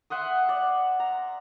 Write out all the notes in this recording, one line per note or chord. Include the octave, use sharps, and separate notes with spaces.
E5 F#5 C6 D#6
D5
A#5